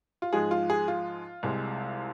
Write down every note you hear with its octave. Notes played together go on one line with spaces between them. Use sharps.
F4
G#2 F3 G#3 G#4
F4
G#4
F4
C2 C3 G#3